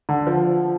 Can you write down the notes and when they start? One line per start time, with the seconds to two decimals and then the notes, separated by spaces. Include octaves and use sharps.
0.09 D3
0.27 F3